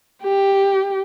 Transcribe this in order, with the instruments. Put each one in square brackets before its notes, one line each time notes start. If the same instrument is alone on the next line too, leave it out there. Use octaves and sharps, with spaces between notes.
[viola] G4